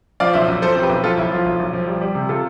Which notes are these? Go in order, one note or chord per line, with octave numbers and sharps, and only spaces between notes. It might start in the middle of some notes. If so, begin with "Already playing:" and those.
F3 D5 F5
B1 C5 E5
B1
F3 A4 C5
C4
G4 B4
B1
F3 F4 A4
B1 E4
F3 F4
B1
B1
F3
G3
G3
C3
C3 F4 A4